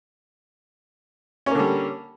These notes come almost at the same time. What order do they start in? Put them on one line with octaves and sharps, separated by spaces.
C#4 A#3 D3 G3